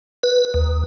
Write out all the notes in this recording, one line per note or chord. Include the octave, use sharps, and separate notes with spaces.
B4
D#2